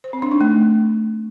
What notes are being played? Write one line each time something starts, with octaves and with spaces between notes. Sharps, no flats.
C5
C4
D4
D#4
A3